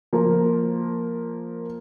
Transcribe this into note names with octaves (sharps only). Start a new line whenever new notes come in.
F3 A#3